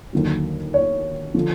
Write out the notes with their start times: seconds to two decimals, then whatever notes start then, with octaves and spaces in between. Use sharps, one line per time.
0.13 D#2 D3 F#3
0.74 C#5
1.34 D3 F3